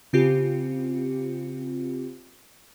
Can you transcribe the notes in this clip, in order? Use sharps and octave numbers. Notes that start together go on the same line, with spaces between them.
C#3 C4 F4 G4 C#7